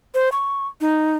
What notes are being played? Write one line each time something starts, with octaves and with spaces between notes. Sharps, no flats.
C5
C#6
D#4